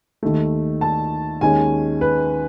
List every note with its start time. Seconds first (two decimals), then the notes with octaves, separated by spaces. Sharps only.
0.23 D#2 D#3 A3
0.81 A5
1.41 D#2 D#3 G#3 C#4 G#5
2.01 B4